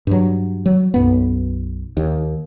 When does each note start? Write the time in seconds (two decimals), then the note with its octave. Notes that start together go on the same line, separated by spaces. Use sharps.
0.07 G2 F#3
0.66 F#3
0.94 B1 F#2 B3
1.97 D#2